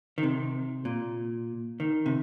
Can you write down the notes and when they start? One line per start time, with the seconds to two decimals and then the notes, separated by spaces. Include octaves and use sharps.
0.18 D#3
0.23 C3
0.85 A#2
1.80 D#3
2.06 C3